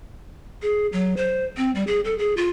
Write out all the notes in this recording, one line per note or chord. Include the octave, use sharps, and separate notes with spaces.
G#4
F#3
C5
C4
G3
G#4
A4
G#4
F4